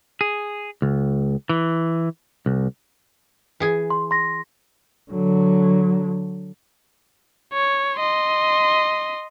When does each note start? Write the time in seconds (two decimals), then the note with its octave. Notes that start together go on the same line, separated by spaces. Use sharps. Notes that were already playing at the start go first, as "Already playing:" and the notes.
0.21 G#4
0.82 C#2
1.49 E3
2.46 C2
3.60 E3 G#4 G#5
3.90 C6
4.11 C6 A#6
5.11 D3 F#3
7.54 C#5
7.97 D#5 C6